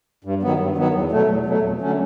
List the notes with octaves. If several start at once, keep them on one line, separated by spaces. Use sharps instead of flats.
G2
D#3 F#3 B3
G2
D#3 F#3 B3
E2
B2 F#3 A3
E2
B2 F#3 A3
F2
D3 F#3 A3 C#4